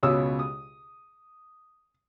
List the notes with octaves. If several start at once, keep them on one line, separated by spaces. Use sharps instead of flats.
C#2 B2 C#5 D#6 E6
D#6